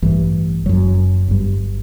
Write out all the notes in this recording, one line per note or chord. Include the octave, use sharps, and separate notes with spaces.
A1 G2 E3
F#1 F#2 F#3
G1 G2